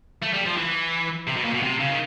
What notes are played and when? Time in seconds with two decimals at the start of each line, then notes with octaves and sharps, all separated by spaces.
0.22 A3
0.33 G3
0.46 F3
0.57 E3
1.28 C3
1.37 B2
1.45 A#2
1.54 B2
1.63 C3
1.80 C#3
1.90 D#3